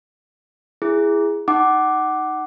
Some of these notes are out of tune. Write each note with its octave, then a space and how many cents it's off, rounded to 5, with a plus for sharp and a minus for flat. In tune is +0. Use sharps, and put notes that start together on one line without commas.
E4 +20 G#4 -5
D#4 +0 F#5 +20 D6 +0